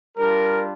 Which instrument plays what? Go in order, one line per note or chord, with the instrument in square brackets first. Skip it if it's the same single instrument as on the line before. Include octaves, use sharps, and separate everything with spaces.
[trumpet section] G3 D4 F4 A#4